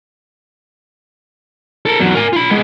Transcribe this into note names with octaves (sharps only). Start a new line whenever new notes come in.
A4 A#4
E2 F#3
A#4 G#5
F4 B5
G#3 B3